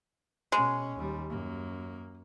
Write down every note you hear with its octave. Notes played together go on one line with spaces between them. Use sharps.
B2 G#3 C#4
D#2 G3
F#2 A#3